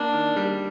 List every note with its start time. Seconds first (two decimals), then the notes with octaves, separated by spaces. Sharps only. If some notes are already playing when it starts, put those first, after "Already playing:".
Already playing: A#3 D4
0.13 D#3
0.36 G3